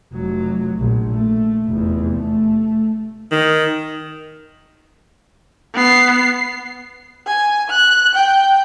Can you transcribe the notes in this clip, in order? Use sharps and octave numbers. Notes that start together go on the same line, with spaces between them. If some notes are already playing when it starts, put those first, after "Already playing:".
F1 F#3
A#1
A3
F1 E2
A3
D#3
B3 C7
G#5
F#6
G5